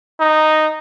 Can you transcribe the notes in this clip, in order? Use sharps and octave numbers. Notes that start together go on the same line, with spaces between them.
D#4